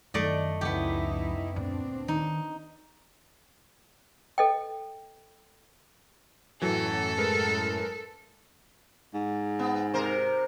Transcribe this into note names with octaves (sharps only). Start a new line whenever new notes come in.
F#2 D#3 F#3 A3 D5 D#5
C#2 F3 B3 D#4 E4 G4
D2 A#2 C4 D4
D#3 D#4
A4 D#5 G5
F#2 A2 E3 F#3 A4
G#3 A#4 B4
G#2
B3
C3 A#4 C5